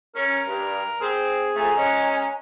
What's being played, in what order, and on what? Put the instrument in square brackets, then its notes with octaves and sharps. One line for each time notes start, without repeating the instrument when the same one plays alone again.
[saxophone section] C#4 [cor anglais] A#4
[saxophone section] G2
[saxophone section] C4 [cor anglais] G#4
[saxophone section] C3 F3 A3 [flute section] G#5 A#5
[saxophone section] G#3 C#4 [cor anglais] D#5